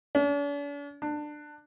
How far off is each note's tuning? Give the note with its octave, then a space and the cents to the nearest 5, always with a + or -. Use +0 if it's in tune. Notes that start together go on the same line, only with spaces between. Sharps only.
D4 -45
D4 +20